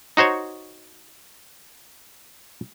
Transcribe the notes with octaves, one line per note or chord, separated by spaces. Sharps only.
D#4 F#4 C5 C#5